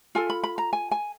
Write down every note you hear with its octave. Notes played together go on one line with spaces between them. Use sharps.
F4 A4 G#5
B5
B5
A#5
G#5
G#5